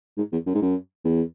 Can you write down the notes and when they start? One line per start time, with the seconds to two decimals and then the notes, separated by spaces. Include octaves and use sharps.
0.17 G#2
0.32 E2
0.46 F#2
0.54 G#2
0.62 F#2
1.04 E2